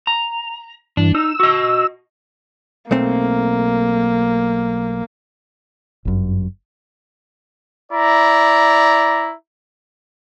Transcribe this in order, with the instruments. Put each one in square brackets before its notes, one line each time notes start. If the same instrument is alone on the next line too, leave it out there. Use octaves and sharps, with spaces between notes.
[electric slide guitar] A#5
[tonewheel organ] G2 E3 [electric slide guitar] D4
[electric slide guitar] D#4 [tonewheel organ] E6
[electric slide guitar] F#4 D#5
[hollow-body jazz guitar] B1 A3 C4 [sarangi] A#3
[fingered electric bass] G1 F#2
[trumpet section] E4 D5 A#5